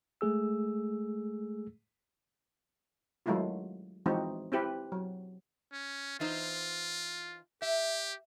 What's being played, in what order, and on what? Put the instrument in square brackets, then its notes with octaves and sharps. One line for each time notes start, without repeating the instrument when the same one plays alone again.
[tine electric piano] G#3 A3 G#4 E6
[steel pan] D#3 F#3 G#3 A3 E4 F4
E3 F3 G#3 C4 D#4 F#4
C4 E4 G4 B4
F#3
[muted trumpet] C#4
[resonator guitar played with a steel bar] E3 D#4 C5 [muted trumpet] F4
[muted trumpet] G4 [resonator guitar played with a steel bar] E5